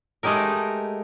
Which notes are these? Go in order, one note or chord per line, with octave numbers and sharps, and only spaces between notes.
G#3 A3 D#4 G4 A#4